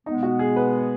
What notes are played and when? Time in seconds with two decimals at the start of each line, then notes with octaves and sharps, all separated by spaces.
0.06 B2 G#3 B3 D#4
0.23 F#4
0.39 G#4
0.56 B4